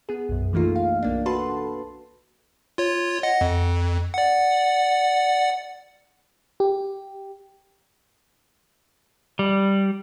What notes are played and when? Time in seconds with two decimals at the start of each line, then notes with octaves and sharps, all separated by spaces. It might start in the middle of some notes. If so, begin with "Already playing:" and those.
0.09 B3 G#4
0.29 B1 F#2
0.53 E3 A3 A#3 D#4 F4
0.76 F5
1.03 B1 A#3 D4
1.26 F#4 A4 B4 A5 C6
2.78 F4 C#5
3.23 D#5 F#5
3.41 F2
4.14 D5 F#5
6.60 G4
9.39 G3